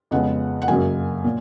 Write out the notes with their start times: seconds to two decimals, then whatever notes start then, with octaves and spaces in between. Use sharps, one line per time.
0.11 F2 C#3 G#3 B3 F#5
0.62 F#5
0.68 F#2 C#3 F#3 A#3 G#5
1.24 A#2